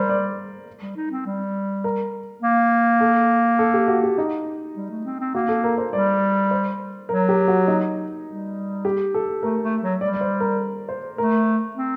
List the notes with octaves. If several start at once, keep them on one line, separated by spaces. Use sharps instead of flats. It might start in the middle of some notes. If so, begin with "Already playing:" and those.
Already playing: G3 A#4 C5
D5
G3
D#4
C4
G3
A#4
A#3
A4
A4
G4
F#4
G4
D#4
G3
A3
C4
C4
A#3 F#4
A4
A#4
C5
G3 D5
C5
F#3 A#4
G4
F#4
D#4
G3
G4
A4
A3 A#4
A3
F#3
G3 D5
D5
C5
A#4
C5
A3 A#4
C4